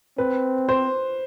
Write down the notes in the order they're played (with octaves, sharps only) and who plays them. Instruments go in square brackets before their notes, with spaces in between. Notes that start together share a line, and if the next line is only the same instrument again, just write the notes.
[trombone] C4 [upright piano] B4
[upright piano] C5